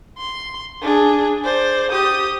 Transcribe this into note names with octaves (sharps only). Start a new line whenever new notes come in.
C6
D4 G#4
C5 D5
G4 D#6